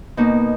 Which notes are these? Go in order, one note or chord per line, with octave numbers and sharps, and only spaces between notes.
B2 A#3 D#4